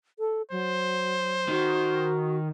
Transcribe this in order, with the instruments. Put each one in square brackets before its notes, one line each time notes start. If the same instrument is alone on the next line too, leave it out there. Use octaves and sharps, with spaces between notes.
[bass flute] A4
[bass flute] F#3 [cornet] C5
[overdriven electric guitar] D#3 [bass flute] F#4